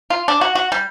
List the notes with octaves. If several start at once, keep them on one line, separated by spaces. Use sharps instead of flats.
F4
D4
F#4
F#4
G3